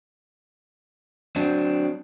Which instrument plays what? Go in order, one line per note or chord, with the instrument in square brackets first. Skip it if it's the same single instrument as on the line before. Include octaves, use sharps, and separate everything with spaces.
[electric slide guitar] F#3 C4 D4